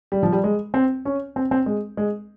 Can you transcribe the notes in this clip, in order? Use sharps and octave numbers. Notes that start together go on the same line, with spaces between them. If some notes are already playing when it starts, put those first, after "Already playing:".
G3
F3
G3
G#3
C4
C#4
C4
C4
G#3
G#3